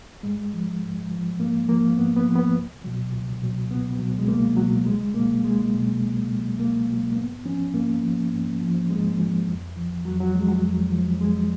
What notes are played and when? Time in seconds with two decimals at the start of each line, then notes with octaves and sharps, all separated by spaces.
0.23 G#2 G#3
0.53 F3
0.82 G#2
1.10 F3
1.39 G#2 A#3
1.68 F3 A#3
1.96 G#2 B3
2.16 B3
2.25 F3
2.35 B3
2.55 C#2
2.84 B2 F#3
3.12 C#2
3.41 B2 F#3
3.71 C#2 B3
3.99 B2 F#3
4.19 G#3
4.27 C#2 A#3
4.57 F#3
4.61 B2
4.85 C#2 G#3
5.14 B2 F#3 A#3
5.43 C#2 G#3
5.73 B2 F#3
6.01 C#2
6.31 B2 F#3
6.59 C#2 A#3
6.89 B2 F#3
7.12 A#3
7.16 G#2 B3
7.45 F3 C#4
7.74 G#2 A#3
8.03 F3
8.32 G#2
8.61 F3
8.90 G#2 G#3
9.19 F3
9.48 F2
9.77 F3
10.05 F2 F#3
10.20 F#3
10.35 F3 G#3
10.48 F#3
10.64 F2
10.92 F3
11.20 F2 G#3